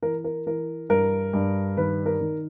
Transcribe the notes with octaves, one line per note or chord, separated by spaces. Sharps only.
E3 A#4
A#4
E3 A#4
G2 A#4
G2
D#3 B4
A#4
D#3